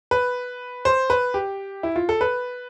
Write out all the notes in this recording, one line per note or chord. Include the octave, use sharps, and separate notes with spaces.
B4
C5
B4
G4
E4
F4
A4
B4